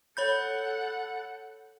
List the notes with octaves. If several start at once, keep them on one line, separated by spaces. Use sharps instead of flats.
A4 C#5 F#5 B5 G6